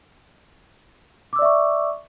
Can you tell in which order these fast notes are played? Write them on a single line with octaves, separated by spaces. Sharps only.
D6 E6 D5 E5 C#6